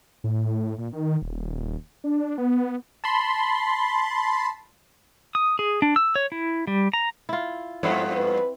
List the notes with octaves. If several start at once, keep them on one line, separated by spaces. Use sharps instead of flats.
A2
A#2
D#3
D#1
D4
B3
A5 B5 C6
D#6
G#4
D4
E6
C#5
E4
G3
A#5
E4 F4
G2 F3 B3 C4 E4 C#5
B4